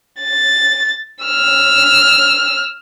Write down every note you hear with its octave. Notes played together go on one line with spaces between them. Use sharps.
A6
E6 F6